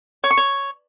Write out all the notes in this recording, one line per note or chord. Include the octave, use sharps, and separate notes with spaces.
C#5
C#6
C#5